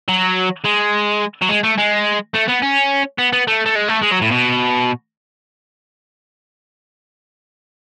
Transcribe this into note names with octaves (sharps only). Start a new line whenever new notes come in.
F#3
G#3
F#3
G#3
A3
G#3
A3
B3
C#4
B3
B3
A3
A3
G#3
A3
G#3
F#3
A2
B2